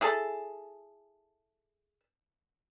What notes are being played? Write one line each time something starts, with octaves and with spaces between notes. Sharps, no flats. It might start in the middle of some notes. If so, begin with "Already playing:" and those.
E4 G#4 A4 A5